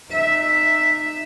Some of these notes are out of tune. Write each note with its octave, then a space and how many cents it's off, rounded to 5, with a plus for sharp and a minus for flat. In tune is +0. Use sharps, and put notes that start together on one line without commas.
D#4 -25 E5 +0